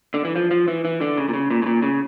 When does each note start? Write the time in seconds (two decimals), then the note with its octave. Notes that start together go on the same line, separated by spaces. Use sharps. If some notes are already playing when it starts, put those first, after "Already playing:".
0.14 D3
0.25 E3
0.36 F3
0.51 F3
0.68 E3
0.85 E3
1.01 D3
1.18 C#3
1.28 A#2
1.33 C#3
1.51 A#2
1.62 A2
1.66 A#2
1.82 C#3